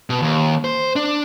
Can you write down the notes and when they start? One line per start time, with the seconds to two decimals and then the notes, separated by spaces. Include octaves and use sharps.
0.10 B2
0.22 D#2
0.64 C5
0.96 D4